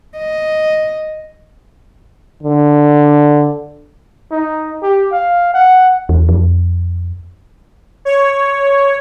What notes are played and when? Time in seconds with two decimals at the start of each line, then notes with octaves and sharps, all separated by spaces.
0.18 D#5
2.43 D3
4.31 D#4
4.83 G4
5.12 F5
5.54 F#5
6.09 E2
6.29 F2
8.05 C#5